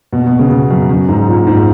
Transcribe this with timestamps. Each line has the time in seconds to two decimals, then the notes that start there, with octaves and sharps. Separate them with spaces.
0.13 B2
0.26 B2
0.39 C#3
0.51 B2
0.70 F#2
0.90 F#2
1.09 G#2
1.28 A#2
1.47 G#2